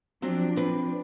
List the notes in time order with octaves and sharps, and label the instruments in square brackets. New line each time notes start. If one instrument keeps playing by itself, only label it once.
[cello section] F3 D4 [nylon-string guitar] F#3 C4
[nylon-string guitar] C4 B4